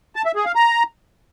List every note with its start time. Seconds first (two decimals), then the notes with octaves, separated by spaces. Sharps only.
0.16 A5
0.26 E5
0.35 G#4
0.45 F5
0.55 A#5